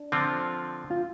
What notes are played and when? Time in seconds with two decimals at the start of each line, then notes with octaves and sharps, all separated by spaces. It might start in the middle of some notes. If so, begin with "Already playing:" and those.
Already playing: D4
0.12 D3 F3 C4 F4
0.91 F4